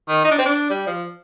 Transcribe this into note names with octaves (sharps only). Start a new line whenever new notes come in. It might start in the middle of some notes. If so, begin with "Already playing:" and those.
D#3
D#4
D4
C4
D4
G3
F3